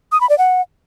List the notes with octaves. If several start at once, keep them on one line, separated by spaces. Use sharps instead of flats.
D#6
B5
D5
F#5